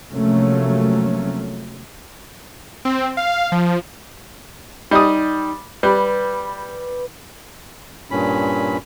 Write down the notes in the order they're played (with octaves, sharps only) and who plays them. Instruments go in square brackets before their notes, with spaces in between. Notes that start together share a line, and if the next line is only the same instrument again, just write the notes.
[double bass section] C3 F3 F#3 A3 A#3 C#4
[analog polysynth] C4
F5
F3
[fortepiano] G3 D#6 [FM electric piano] D#4
[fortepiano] G3 [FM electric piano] B4
[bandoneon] G2 A#2 C#4 B5